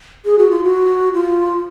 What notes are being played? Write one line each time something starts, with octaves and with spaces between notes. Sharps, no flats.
G#4
F#4
F4
F#4
F4